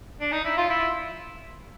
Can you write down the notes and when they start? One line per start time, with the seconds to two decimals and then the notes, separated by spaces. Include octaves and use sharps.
0.20 D4
0.32 D#4
0.45 E4
0.57 F4
0.70 E4